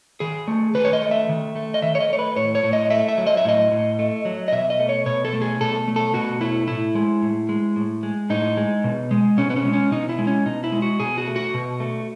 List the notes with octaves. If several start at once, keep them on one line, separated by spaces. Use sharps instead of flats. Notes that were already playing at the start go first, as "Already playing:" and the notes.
D#3 G#4
A3
D#3 B4
C#5
D#5
A3
E5
D#3
A3
D#5
D#3 E5
C#5
D#5
A3 C#5
B4
A2 C#5
C#5
A2
D#5
A3 E5
E5
F#3
D#5
E5
A2 D#5
A2
A3
F#3
D#5
B2 E5
D#5
A3
C#5
B2 C#5
A4
A3
G#4
B2 A4
A3
A4
B2 F#4
A3 E4
A2 E4
G#3
A2
G#3
A2
G#3
A2 D#4
G#3
B2
G#3
B2 C#4
B3
C#4
G#3
C#4
B2 D#4
E4
G#3
C#4
B2 D#4
E4
G#3
F#4
B2 G#4
F#4
A3
F#4
B2
A3